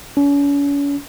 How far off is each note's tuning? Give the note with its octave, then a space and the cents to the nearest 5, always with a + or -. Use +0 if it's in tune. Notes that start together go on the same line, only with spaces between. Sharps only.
C#4 +40